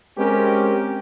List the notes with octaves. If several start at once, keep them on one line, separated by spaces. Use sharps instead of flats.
G#3 C4 C#4 G4 A#4